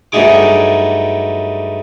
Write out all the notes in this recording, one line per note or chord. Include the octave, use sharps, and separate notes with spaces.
G2 F#3 A3 D#4 G#4 D6